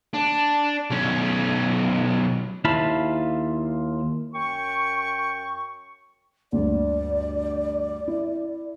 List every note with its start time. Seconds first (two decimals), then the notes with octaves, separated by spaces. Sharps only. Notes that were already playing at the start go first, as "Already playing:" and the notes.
0.14 D4
0.90 B1 C#4
2.65 D#2 E4 F4 F5 A5 B5
4.34 F#2 G5 C#6
6.52 D2 G2 D5
8.08 E4